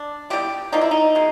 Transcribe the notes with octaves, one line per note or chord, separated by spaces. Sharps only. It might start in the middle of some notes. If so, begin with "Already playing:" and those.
Already playing: D4
E3 G3 B3 G4
D3 F3 A#3 D#4
E4
D#4
B2 G#3